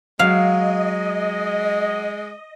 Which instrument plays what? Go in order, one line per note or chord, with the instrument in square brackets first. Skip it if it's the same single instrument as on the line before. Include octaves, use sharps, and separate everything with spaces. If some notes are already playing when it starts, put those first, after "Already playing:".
[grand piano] F#3 [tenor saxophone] G#3 [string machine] D#5 [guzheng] F5